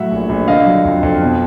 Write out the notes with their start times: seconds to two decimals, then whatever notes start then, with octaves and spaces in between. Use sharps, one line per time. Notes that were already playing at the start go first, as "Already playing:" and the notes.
Already playing: A2 F#3 E5 F#5
0.11 A#1
0.29 A#1
0.48 D3 D#5 F5
0.66 F#3
0.85 F2
1.03 F2
1.21 B2